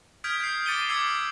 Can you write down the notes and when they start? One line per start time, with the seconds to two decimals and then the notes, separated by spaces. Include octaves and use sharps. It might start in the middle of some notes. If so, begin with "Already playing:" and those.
0.24 D#6 F6 G6 G#6 B6 D7
0.40 G6 C7
0.66 D6 A6 C#7 D#7 G7
0.89 D6 E6 G#6 C7